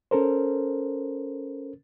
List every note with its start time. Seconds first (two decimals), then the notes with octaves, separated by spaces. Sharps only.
0.11 C#4 A4 A#4 C5